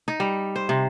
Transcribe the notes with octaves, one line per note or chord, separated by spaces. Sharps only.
D#4
G3
C5
C3